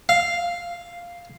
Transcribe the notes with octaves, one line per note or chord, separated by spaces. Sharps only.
F5